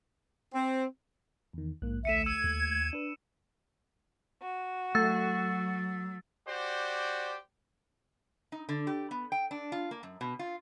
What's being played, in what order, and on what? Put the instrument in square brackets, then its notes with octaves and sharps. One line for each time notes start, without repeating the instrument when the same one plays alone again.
[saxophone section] C4
[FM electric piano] E2 D#3
[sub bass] A#1 [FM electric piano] G#2 A#3 F#6
[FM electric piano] D2 A3 [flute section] E5 [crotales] C#7 D#7 E7
[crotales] E6 C#7 D#7 [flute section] G#6
[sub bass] D#2
[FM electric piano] D4 B4
[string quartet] F#4
[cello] F#3 [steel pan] A3 [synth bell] E6 A6
[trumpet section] F#4 G4 C5 D5
[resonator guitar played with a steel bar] D#4
D3
G4
B3
G5
D4
F4
A#3
F#2
B2
F4